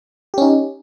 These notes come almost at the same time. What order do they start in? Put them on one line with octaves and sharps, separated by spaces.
G4 C#4 D#4